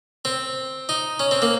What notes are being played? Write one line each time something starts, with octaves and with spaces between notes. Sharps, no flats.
C4
D#4
C#4
C4
A#3